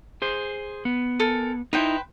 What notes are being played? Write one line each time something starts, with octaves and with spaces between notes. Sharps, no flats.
G#4 C5
B3
A4 A#4 G#5
D#4 E4 B4 C5 G5